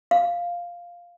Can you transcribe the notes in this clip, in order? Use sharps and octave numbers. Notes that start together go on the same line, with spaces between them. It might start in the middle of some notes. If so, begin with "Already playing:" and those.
F5